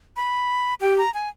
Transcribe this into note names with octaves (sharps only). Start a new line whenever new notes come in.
B5
G4 G5
A#5
G#5